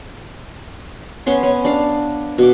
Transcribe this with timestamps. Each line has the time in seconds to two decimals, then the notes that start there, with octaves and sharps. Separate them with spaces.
1.26 B3 C#4 C6
1.43 C#4
1.65 D4 F5
2.38 B2 D6